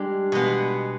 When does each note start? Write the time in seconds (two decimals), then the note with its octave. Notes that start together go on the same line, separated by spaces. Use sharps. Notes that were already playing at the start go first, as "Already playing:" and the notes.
Already playing: G3 G#3 D4 G4
0.32 B2 G#3 B3